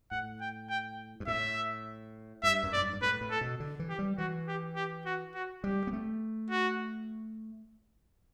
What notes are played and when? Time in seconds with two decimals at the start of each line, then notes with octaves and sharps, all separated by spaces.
0.11 A2 F#5
0.41 G5
0.69 G5
1.20 G2
1.27 A2 E5
2.43 G2 E5
2.63 F#2
2.73 A2 D5
2.82 G2
2.93 G2
3.02 A2 B4
3.21 A2
3.31 A4
3.41 B2
3.60 D3
3.79 E3
3.89 G4
3.99 G3
4.18 E3 F#4
4.48 G4
4.76 G4
5.06 F#4
5.35 F#4
5.64 G3 G4
5.87 B3
5.93 A3
6.50 F#4